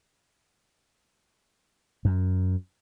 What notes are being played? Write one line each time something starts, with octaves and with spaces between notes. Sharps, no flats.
F#2